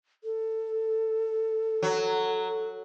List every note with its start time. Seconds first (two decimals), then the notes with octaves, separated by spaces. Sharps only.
0.24 A4
1.83 F#3